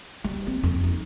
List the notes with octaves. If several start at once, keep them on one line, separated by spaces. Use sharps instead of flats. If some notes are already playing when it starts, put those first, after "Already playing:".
G3
C4
F2
D#4